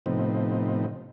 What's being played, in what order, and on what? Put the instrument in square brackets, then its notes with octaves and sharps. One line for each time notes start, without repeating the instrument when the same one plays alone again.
[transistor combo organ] A2 C3 F3 B3 C4 D#4